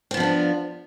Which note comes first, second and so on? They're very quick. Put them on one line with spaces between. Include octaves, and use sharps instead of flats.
C4 B3 F3 D4 F4